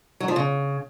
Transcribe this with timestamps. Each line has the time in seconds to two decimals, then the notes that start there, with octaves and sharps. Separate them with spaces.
0.20 F#3
0.28 F3
0.36 C#3